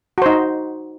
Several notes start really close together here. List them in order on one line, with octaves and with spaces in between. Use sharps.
F#4 C5 D#4